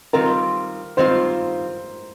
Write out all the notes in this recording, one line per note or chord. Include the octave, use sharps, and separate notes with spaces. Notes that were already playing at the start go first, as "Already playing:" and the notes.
D#3 G3 C4 F4 A#4
D#3 G3 C4 F4 C5